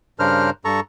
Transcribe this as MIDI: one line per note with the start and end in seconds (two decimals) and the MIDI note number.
0.19 0.50 43
0.19 0.50 49
0.19 0.50 62
0.19 0.50 70
0.19 0.50 72
0.19 0.50 89
0.65 0.80 43
0.65 0.80 69
0.65 0.80 82
0.65 0.80 85